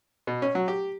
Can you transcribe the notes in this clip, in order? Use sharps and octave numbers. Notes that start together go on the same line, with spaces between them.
B2
C#4
F#3
G4